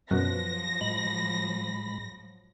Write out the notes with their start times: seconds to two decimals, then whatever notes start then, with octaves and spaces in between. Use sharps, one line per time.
0.11 F#2 B2 F3 F#3 B4 A#6
0.81 A2 G#3 B5